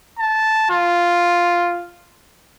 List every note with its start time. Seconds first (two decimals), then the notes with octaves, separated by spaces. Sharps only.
0.19 A5
0.70 F4